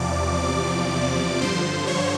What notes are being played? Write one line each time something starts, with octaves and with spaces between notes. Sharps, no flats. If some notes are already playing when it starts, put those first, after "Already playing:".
Already playing: E2 C3 F3 D5 D6
G2 D3 F3 C5 C6
C#5 C#6